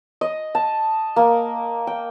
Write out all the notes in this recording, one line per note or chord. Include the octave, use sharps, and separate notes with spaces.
D#5
A5
A#3
G5